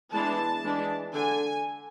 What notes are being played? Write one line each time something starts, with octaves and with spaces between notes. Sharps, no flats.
E3 G#3 B3 D4 A5
E3 G#3 D4
D3 G#5